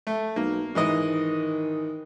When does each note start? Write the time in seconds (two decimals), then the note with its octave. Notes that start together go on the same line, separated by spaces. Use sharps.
0.07 A3
0.36 B1 A#3
0.75 G#2 D#3 E3 D#5